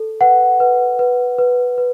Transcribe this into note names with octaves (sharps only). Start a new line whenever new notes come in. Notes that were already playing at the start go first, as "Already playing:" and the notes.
Already playing: A4
B4 F#5
B4
B4
B4
B4